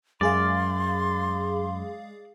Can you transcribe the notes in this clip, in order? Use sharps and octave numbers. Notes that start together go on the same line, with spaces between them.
F#2 G#3 G#4 D5 F5 C6